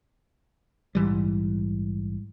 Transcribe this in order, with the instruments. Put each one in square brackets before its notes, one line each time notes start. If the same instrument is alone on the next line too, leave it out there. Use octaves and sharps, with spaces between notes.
[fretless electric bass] A#1 G#2 E3 G3